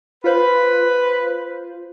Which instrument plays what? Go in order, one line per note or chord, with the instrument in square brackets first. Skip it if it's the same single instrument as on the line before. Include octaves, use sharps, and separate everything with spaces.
[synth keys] F4 C5 [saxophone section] B4